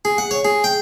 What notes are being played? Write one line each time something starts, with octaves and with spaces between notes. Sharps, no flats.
G#4
F#5
C#5
G#4
G5